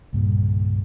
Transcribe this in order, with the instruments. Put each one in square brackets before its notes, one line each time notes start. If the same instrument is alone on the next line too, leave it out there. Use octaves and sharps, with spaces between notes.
[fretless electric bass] C2 G2 A#2 C#3